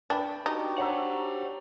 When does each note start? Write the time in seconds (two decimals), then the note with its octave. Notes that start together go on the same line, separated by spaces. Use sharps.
0.10 D4 B4 G5 B5
0.46 D4 D#4 F#4 G4
0.78 C5 C#5 F#5 A#5 E6